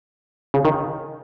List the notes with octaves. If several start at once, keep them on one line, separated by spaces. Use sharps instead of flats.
C#3
D#3